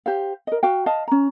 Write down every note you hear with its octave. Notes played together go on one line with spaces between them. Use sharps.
G4 C5 F5
A#4 D#5
F#4 F5 G5
D#5 F5 A5
C#4 A#5